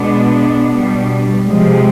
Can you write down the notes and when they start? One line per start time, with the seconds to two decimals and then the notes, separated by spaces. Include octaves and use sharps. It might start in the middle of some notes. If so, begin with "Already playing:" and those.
Already playing: B2 G#3 B3 D4
0.69 B2 G3
1.47 C3 F3 G#3